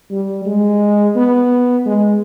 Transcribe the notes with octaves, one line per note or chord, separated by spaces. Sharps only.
G3
G#3
B3
G#3